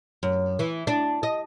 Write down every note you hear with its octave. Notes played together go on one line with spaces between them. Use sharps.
F#2
E3
D4
D#5